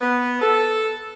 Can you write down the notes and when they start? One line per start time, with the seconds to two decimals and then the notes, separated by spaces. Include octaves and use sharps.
0.01 B3
0.42 A4